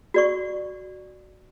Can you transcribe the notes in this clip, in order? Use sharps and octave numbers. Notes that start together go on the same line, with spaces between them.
F#4 D5 C#6